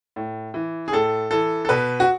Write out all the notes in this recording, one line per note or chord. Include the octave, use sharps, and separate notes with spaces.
A2
E3
G#4
A2 A4
E3 A4
A4
B2 B4
F#4